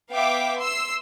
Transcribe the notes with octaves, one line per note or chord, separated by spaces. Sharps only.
B3 E5 F5 G5 D6
C6 E6 C7